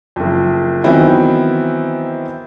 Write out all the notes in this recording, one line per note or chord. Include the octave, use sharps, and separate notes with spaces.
F#1 F2
D#3 E3 F#3 B3 C4 E4